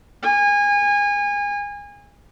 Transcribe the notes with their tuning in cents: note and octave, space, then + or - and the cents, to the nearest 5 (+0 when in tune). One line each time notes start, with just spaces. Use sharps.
G#5 -25